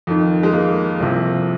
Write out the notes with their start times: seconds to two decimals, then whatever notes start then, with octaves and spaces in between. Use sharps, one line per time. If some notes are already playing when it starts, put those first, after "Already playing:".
0.07 F2 D#3
0.43 G#3
0.53 A#3
1.00 C2 C3 F3